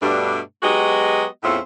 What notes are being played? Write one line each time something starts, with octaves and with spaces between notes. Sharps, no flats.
G2 B2 G3 A3 D4
F#3 G#3 B3 F#4 G4 D#5
E2 A2 C4 C#4 F4 E5